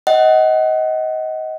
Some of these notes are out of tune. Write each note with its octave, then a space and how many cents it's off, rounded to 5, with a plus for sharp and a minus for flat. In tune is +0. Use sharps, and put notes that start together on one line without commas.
D#5 +20 F#5 +20